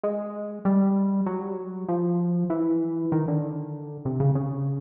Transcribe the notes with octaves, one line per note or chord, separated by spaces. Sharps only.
G#3
G3
F#3
G3
F#3
F3
E3
D#3
D3
C3
C#3
C#3